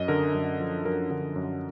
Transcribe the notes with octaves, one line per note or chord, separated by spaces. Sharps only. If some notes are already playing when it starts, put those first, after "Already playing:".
Already playing: F#2 D#5
D3 A#4
F#2
F3
F#2 A#4
D3
F#2